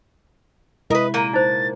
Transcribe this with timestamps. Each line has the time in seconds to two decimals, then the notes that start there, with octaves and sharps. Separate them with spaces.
0.90 C3 G#3 E4 A#4 B4 D#5
1.14 A#2 A#3 D#7
1.33 D#4 C5 A6